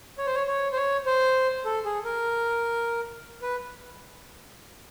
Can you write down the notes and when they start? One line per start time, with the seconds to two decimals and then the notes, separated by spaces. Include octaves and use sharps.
0.18 C#5
0.27 C5
0.34 C#5
0.47 C#5
0.72 C5
0.77 C#5
1.06 C5
1.65 A4
1.85 G#4
2.04 A#4
3.42 B4